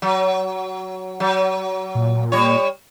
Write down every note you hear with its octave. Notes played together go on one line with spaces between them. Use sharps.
F#3
F#3
A#2
G3 C#5